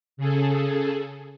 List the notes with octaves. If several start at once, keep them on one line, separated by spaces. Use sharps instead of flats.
C#3 G#4 A4